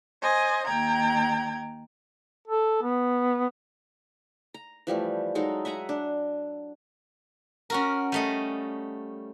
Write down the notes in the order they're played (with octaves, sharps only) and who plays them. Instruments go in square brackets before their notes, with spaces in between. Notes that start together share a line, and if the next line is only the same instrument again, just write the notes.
[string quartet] C5 D#5 G#5
D#2 G5 A#5 G#6
[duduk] A4
B3
[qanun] A#5
E3 F3 G3 A3
F#3 G#3 D#4 A4
E5 F#5 G#5 A#5
D4
[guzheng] C#4 F#4 A#4
G3 A3 D#5